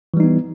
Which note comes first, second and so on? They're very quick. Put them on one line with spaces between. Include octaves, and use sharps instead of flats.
E3 G3 D#4 B3